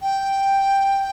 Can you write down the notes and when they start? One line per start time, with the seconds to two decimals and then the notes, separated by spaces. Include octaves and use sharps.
0.02 G5